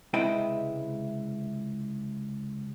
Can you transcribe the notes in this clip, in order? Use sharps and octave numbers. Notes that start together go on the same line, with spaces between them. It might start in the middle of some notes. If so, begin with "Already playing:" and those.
C#2 C3 G#3 E4 B4 G5